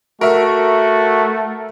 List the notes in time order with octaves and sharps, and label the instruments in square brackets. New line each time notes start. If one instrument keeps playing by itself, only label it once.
[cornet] A3 [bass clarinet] F#4 [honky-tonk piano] A#4 E5